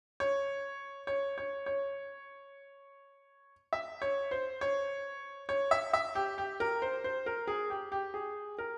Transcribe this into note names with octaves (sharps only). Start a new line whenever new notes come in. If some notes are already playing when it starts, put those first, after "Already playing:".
C#5
C#5
C#5
C#5
E5
C#5
C5
C#5
C#5
E5
E5
G4
G4
A#4
C5
C5
A#4
G#4
G4
G4
G#4
A#4